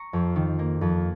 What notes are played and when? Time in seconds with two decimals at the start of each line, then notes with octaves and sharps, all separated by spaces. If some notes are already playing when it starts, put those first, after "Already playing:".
Already playing: A#5 C#6
0.13 F2
0.36 D#3
0.59 A#3
0.81 F2